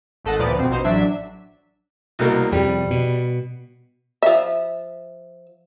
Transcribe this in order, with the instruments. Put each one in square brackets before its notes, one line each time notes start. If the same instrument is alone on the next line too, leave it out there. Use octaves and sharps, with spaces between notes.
[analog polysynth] G#1 A3 A4 D#5 F#5 C7
D2 A#2 F3 B3 D5 C#7
F2 B2 C4
A#1 B2 D#4 C5
A1 F#3 D4 E5
[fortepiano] C2 B2 A#3
[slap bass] F2 C3 [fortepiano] G3
[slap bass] B2
[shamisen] F3 E5